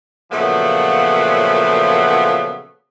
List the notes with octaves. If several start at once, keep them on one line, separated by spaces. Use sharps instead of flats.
A#2 C#3 F3 F#3 A3 B3